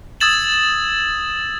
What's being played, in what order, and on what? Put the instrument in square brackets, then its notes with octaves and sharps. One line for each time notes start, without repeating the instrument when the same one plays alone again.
[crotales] D#6 E6 G#6 A6 E7 F#7